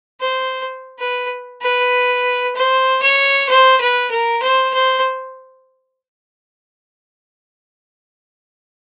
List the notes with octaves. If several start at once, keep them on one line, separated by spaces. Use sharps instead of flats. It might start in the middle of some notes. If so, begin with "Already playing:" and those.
C5
B4
B4
C5
C#5
C5
B4
A#4
C5
C5